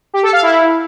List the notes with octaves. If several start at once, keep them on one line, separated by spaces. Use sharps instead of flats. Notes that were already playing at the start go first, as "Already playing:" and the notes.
G4
A4
F5
E4